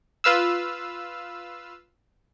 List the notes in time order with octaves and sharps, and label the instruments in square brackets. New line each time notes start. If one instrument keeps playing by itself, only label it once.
[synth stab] F4 B4 F5 E6